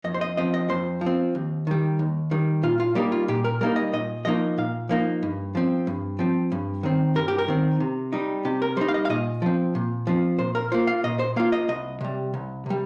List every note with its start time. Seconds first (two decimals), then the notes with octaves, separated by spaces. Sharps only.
0.04 F2 D#5
0.14 C5
0.21 D#5
0.37 F3 C4 D#5
0.54 D#5
0.69 F2 C5
1.01 F3
1.06 C4
1.35 D#2
1.67 D#3 G3
1.99 D#2
2.31 D#3 G3
2.63 A#2 F4
2.80 F4
2.95 G3 A#3 D#4 G4
3.12 F4
3.28 A#2 G4
3.44 A#4
3.61 G3 A#3 D#4 A#4
3.76 D#5
3.93 A#2 D#5
4.25 F3 A#3 D#4 D#5
4.58 A#2 F5
4.89 F3 A#3 D#4
5.23 G2
5.55 F3 C4
5.87 G2
6.19 F3 C4
6.52 G2
6.83 D#3 C4
7.15 G2 A#4
7.28 G4
7.38 A#4
7.48 D#3 C4
7.80 C3
8.13 G3 D#4
8.45 C3 G4
8.62 A#4
8.77 G3 D#4 C5
8.88 F5
8.94 D#5
9.05 F5
9.09 A#2 D#5
9.42 F3 C4
9.75 A#2
10.07 F3 C4
10.39 A#2 C5
10.55 A#4
10.72 A#3 F4 C5
10.87 F5
11.04 A#2 D#5
11.19 C5
11.36 A#3 F4 F5
11.52 D#5
11.68 C2 D#5
12.01 C3 G3
12.34 C2
12.66 C3 G3